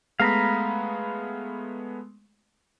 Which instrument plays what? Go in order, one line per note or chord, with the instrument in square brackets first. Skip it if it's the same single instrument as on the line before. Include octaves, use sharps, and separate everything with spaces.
[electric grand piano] G#3 A3 B3 [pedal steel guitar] F5 A#5 B5